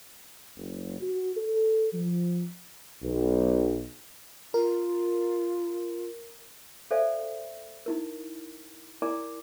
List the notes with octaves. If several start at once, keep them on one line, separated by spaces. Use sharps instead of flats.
F#1
F#4
A4
F3
B1
F4 A#4
A4 C5 D5 E5 F5 G#5
D#4 E4 A#4
E4 A#4 D5 G#5 A#5 D6